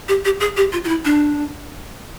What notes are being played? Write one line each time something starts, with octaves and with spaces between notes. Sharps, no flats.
G4
G4
G#4
G4
F4
F4
E4
D4